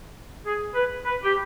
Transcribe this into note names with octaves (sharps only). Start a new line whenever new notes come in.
G#4
B4
B4
G4